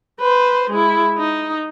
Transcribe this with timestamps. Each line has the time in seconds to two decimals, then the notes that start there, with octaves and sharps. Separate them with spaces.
0.20 B4 C5
0.70 G#3 E4
1.18 D#4